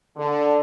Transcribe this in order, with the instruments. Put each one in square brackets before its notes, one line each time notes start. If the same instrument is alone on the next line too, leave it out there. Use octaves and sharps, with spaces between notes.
[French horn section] D3